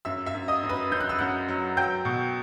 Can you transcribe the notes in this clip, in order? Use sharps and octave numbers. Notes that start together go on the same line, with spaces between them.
F#2 E5 E6
E5 E6
F#2
D#5 D#6
F#2
B4 B5
F#2 G6
F#6
E6
F#2 F#5 F#6
F#3
F#3 G5 G6
B2